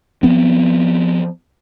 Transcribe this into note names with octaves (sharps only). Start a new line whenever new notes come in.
F3 B3 C4